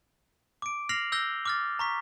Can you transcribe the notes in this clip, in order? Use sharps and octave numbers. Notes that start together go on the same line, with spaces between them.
D6 D7
F6 A#6 C7 F7 F#7
E6 G6 A#6 G7
D6 F6 A6
A#5 C#6 B6